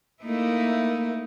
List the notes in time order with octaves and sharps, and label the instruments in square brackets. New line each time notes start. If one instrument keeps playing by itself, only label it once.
[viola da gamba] A3 D#4 E4 [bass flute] A#3